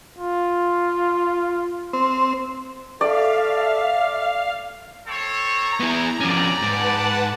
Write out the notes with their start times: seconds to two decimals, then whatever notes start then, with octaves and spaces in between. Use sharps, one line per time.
0.18 F4
1.93 C4
3.01 A4 D5 E5 F5
5.06 C4 A4 C#5
5.47 A#5
5.80 B3 E4
6.20 F2 C#4 G4 D5
6.62 G#2 B4 F#5 A5